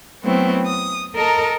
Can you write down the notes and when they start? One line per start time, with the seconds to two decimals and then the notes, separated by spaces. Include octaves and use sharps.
0.21 F#3 A3 B3 C4 E4
0.65 D#6
1.14 A4 A#4 D#5 A5 A#5